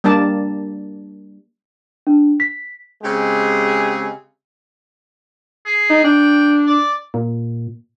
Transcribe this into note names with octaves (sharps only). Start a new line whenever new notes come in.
G3 A#3 D4 D5 A5
D4
B6
C#3 G#3 C4 G4 G#4
G#4
D#4
D4 G5
D5
A#2